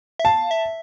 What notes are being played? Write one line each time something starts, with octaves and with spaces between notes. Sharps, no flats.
E5
F5 A5
E5